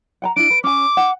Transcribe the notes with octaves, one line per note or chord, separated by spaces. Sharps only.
F#5 G5 A#5
D4 E4 D7
B4
C#4 G#5 D6
F#5